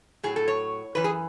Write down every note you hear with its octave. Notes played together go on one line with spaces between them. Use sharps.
A2 F#3 G#4
A4
C#5
F#2 E3 B4
G#4